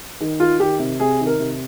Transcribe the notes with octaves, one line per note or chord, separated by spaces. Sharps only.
D#3
D#3 F4
D#3 G4
C3
C3 G#4
D#3
A#4
C3